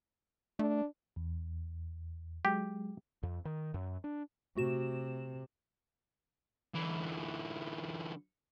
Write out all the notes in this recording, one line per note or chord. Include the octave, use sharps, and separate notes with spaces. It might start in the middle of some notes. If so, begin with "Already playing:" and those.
A3 D4
E2
F#3 G#3 G4
F2
D#3
F#2
D4
C3 A3 F#4 E7
D3 E3